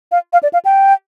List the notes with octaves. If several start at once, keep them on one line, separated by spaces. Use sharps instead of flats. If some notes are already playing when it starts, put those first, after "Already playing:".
F5
F5
D5
F5
G5